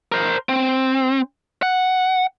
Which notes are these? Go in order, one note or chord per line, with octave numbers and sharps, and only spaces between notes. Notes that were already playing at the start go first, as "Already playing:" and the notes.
A#4 C5
C4
F#5